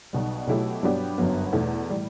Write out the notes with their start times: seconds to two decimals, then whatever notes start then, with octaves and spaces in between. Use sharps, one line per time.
0.13 B1 B2 G3
0.47 B2 F#3 A3 E4 G4
0.83 G2 F#3 B3 D4 G4
1.18 G1 F#2 F#3 B3
1.53 E2 B2 A3
1.89 A2 E3 G3